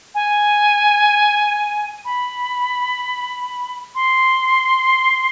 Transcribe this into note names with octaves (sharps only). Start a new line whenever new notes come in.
G#5
B5
C6